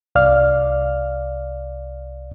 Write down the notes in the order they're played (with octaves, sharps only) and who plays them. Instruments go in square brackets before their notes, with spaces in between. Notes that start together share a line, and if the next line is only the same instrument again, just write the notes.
[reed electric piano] C2 D5 F5 F6